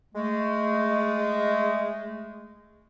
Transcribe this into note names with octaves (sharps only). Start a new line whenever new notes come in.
G#3 A3